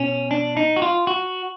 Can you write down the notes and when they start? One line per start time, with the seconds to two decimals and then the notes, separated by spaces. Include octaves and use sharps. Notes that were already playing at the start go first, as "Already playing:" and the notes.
Already playing: B2 C#4
0.31 D4
0.57 D#4
0.76 F#4
0.82 F4
1.07 F#4